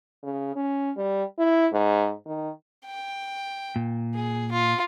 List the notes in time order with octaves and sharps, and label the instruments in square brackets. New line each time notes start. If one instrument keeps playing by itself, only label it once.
[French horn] C#3
C#4
G3
E4
G#2
D#3
[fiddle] G5
[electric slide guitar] A#2
[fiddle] G#4
F4